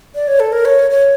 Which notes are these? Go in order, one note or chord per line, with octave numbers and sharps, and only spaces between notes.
D5
C#5
A4
A#4
C#5
C#5